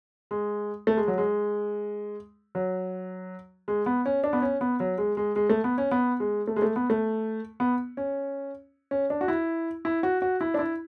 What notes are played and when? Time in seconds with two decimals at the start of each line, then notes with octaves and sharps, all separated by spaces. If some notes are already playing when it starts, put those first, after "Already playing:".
0.31 G#3
0.87 A3
0.97 G#3
1.08 F#3
1.18 G#3
2.55 F#3
3.68 G#3
3.86 B3
4.06 C#4
4.24 D4
4.33 B3
4.42 C#4
4.61 B3
4.80 F#3
4.98 G#3
5.17 G#3
5.36 G#3
5.50 A3
5.64 B3
5.78 C#4
5.91 B3
6.20 G#3
6.47 A3
6.56 G#3
6.62 A3
6.76 B3
6.90 A3
7.60 B3
7.97 C#4
8.91 C#4
9.10 D4
9.21 F#4
9.28 E4
9.85 E4
10.03 F#4
10.22 F#4
10.41 E4
10.54 D4
10.59 E4